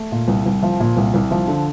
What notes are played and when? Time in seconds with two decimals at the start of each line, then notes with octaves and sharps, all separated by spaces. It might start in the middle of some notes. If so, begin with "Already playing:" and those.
Already playing: A3
0.12 A#2
0.28 C2
0.46 C2
0.63 F3
0.80 A#2
0.97 C2
1.14 C2
1.31 F3
1.48 D3